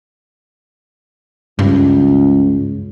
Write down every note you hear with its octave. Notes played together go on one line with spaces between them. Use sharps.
C#2 G2